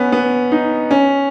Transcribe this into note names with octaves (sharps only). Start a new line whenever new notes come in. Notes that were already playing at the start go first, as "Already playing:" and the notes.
Already playing: B3 C#4
B3
D#4
C#4